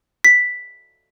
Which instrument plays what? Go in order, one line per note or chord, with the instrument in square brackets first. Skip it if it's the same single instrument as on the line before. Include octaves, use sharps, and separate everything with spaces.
[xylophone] B6